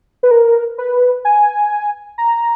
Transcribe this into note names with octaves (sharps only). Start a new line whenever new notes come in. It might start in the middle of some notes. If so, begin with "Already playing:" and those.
B4
A#4
B4
G#5
A#5